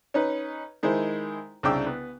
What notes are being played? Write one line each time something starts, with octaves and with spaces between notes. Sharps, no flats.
C#4 D#4 B4
D#3 G#3 E4 C5
C2 C#3 D4 G5 D6 E6
B3